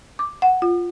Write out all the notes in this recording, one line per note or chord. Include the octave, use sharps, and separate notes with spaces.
D6
F#5
F4